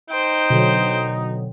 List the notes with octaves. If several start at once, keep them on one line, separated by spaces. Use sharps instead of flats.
D#4 C5 G5
B2 D3 F#3